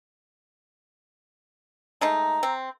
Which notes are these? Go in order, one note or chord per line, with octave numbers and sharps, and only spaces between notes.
G#3 A3 D#4 A#5
C4